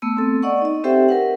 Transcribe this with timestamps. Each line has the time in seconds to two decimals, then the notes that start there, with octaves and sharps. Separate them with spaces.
0.02 A3 B3 E6
0.17 C4 A4
0.43 D5 D#5 F#5 C#6
0.62 D#4 D#5
0.84 C4 G4 A4 C5 E5 G5
1.09 A#4 B4 F#5